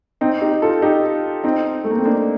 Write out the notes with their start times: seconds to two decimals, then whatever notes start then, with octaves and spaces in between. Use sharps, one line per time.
0.21 C4 D#4
0.41 D#4 G4
0.62 F4 A4
0.82 D#4 G4
1.44 C4 D#4
1.84 A3
1.91 A#3
1.98 C4
2.05 A#3 D4